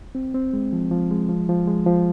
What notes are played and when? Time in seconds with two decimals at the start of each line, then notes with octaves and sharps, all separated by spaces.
0.15 C4
0.34 C4
0.53 G#3
0.73 F3
0.91 F3
1.11 G#3
1.29 F3
1.49 F3
1.68 G#3
1.86 F3